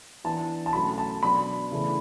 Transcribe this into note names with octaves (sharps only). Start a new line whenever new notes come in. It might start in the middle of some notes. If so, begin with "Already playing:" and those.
E3 B3 D4 A5
A5
B2 F#3 A3 C#4 B5
A5
B2 F#3 B3 D4 B5
C#3 E3 A3 D4